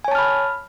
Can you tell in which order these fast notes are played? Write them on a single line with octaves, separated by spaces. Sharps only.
G#5 C#5 A5 F6 B5